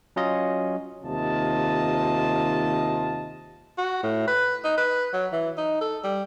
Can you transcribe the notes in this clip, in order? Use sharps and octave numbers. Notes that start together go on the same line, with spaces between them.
F#3 C#4 F4 D#5
D#2 C3 F4 D#5 A5
F#4
A2
B4
D#4
B4
F#3
E3
D#4
A4
G3